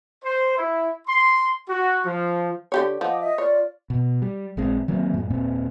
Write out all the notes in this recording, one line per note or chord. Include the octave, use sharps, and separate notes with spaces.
C5
E4
C6
F#4
F3
D3 G4 C#5
F3 D#5 F#5 D6
D#5 E5
F4 C#5 D5
B2
G3
A#1 G#3 C4
D#3 F#3 A#3 C4
F#2 A2
D#1 A#2 C4